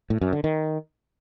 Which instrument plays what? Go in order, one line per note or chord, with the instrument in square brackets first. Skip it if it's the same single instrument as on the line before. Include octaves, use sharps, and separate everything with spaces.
[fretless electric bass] A2
F#2
D3
D#3